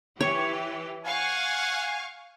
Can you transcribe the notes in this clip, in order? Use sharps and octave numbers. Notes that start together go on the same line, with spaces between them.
E3 G4 C#5
F5 F#5 G#5 C#6